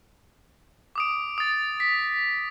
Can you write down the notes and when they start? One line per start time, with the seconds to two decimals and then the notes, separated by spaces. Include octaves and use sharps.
0.96 D6 D#6 D7
1.38 D#6 A6
1.80 B6